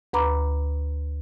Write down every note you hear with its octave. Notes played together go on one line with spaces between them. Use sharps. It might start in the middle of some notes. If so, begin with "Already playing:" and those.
D2 B4 A#5 B5 D6